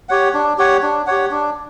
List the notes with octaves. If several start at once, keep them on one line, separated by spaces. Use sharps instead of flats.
G4 C#5 F#5
D4
G4 C#5 F#5
D4
G4 C#5 F#5
D4